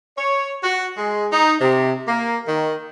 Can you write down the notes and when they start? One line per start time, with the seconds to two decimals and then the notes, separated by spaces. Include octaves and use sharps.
0.18 C#5
0.63 F#4
0.97 G#3
1.32 D#4
1.61 C3
2.06 A#3
2.47 D#3